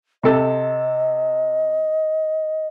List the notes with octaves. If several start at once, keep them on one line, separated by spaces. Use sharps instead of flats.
C3 A4 D#5